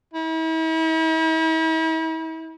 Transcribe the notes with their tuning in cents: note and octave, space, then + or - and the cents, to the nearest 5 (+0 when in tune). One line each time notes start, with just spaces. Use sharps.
E4 -40